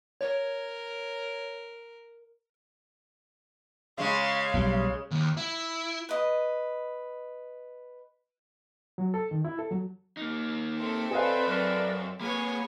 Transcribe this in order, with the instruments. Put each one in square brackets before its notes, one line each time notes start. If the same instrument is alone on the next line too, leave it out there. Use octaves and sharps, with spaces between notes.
[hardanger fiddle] A#4 [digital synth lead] C#5
[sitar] C#3 G#3 C#4 [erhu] F5
[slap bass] B1 F#3 G3
[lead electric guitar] D#2
E4
[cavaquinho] B4 D#5
[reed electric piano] F#3
A4
D#3
E4
A4
F#3
[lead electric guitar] A#3 D#4
[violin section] C4 A4 E5
[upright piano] G#4 D#5 F5 [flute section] B4 C5 D5
[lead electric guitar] F#2 [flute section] A#4 B4 D5
[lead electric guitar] A#3 B4 [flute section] G#4 [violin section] C#5 G#5 [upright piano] B5